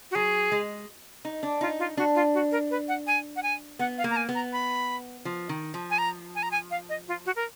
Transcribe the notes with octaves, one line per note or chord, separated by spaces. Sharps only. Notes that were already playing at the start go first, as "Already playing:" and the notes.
F#4
F#3 G#4
G#3
D#4
D4
D#4 F4
F4
D4 F#4
F4
F#4
A#4
B4
F#5
G#5
F#5
G#5
B3 F#5
F5
A#3
A#5
G#5
B3
A#5
B5
F3
D#3
F3
G#5
A#5
G#5
A#5
G#5
F5
D#5
F4
F#4
A#4